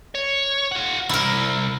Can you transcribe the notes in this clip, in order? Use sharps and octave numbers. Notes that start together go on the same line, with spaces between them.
C#5
F4 F#5
C2 E4 A#4